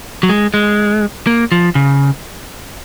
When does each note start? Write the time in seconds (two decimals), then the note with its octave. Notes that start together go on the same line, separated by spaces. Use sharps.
0.23 F#3
0.29 G#3
0.54 G#3
1.27 A#3
1.52 F3
1.75 C#3